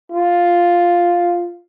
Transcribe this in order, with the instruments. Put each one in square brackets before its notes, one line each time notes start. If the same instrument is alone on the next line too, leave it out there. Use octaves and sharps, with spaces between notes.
[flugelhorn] F4